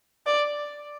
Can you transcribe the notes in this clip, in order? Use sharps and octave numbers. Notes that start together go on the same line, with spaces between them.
D5